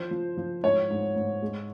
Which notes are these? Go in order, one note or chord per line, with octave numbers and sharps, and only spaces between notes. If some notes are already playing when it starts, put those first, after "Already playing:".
Already playing: F3 C5
F3
F3
G#2 C#5
G#2
G#2
G#3